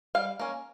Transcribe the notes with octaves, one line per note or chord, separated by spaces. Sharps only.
G3 F5
A#3 C#4